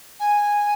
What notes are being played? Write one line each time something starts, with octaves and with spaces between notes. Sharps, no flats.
G#5